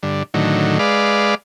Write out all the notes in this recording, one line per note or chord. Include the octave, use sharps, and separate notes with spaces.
G2 D3
A2 D3 D#3 F#3
G#3 B4 D5 F5